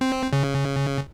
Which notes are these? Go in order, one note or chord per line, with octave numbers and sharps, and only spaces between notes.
C4
C#3